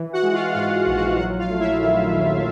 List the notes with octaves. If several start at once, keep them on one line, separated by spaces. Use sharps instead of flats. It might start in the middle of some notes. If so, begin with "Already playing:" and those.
Already playing: E3
F#4 F#5
G#3
F4 F5
G#2 F4 F5
A#1
F#4 F#5
F#3 F#4 F#5
F4 F5
A3
E4 E5
D#3
D#2